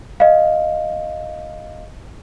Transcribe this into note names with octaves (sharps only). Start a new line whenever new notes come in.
D#5 F5